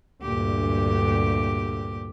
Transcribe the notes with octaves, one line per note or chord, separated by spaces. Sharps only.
D2 G2 A#2 G4